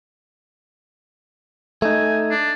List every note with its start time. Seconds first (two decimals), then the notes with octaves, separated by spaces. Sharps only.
1.82 A3 D#4 G#5
2.31 D4